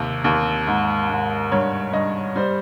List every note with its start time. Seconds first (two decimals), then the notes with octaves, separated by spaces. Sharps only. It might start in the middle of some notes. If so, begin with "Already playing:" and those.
Already playing: D#2 C3
0.24 D#2
0.67 G#2
1.10 G#2
1.52 G2 C#5
1.93 G2 D#5
2.36 G3 C5